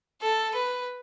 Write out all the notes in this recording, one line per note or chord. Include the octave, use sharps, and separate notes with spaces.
A4
B4